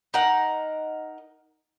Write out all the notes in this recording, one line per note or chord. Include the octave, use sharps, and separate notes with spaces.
D#4 A#4 F#5